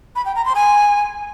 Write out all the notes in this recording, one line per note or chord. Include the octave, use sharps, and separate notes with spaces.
B5
G5
A#5
C6
G#5